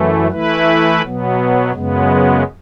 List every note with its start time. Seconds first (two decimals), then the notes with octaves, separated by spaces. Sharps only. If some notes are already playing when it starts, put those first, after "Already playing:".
Already playing: F#2 E3 A3
0.31 E3 A3 E4 B4
1.02 B2 F#3 B3
1.72 F#2 C#3 G#3 B3